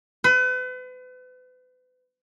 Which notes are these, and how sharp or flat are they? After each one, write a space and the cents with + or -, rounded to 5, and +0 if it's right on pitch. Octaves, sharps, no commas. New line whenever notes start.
B4 +40